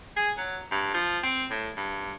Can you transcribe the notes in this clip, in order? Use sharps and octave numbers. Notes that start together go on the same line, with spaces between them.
G#4
F#3
G2
F3
C4
A2
G2